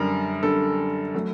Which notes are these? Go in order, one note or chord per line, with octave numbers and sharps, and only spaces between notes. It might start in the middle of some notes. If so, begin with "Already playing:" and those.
Already playing: F#2 D3 G3 A#4
F#2 D3 G3 A4
F#3 A3